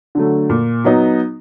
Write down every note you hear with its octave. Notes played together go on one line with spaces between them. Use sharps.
D3 F#3 A3
A#2
F#3 B3 D#4